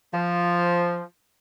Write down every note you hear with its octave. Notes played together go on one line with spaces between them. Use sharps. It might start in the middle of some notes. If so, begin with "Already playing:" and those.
F3